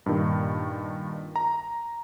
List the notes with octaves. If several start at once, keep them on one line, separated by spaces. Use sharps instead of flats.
G2 A#2 D#3
A#5